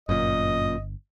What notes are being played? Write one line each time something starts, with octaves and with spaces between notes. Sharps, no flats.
G1 F#2 A#2 D#5